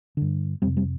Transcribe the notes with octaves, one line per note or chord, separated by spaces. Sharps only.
G2 D3
F2 C3 G3 C4
G3 C4